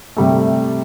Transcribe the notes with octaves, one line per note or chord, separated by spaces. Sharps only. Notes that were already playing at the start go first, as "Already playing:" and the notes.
C3 G3 A3